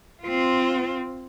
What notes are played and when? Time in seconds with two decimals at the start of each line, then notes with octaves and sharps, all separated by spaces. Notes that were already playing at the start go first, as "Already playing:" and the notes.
0.23 C4 F4